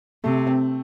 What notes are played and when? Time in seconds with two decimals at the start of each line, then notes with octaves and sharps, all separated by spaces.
0.24 C3 A3
0.47 C4